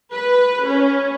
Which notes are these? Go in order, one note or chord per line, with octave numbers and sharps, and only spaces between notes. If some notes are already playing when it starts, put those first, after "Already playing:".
B4
C#4